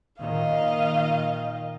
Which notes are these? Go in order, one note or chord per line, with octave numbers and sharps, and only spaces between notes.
A#2 D#3 D#5 F5